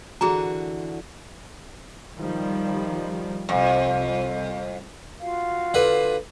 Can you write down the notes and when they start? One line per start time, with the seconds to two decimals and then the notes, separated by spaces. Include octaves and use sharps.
0.21 D3 E3 F#4 G#4 A#5
2.17 D#3 F3 G3
3.49 C2 F2
5.21 F4 F#4 F5
5.74 D3 B4